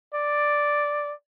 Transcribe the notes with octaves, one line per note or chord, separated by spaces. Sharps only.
D5